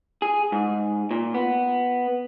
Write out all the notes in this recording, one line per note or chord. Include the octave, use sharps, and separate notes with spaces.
G#4
G#2
A#2
B3